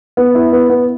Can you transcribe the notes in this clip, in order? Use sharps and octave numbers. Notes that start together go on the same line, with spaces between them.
B3
E4
B3
B3